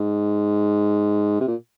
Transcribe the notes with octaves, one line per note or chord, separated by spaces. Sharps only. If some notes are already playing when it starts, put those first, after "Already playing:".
Already playing: G#2
C3
A#2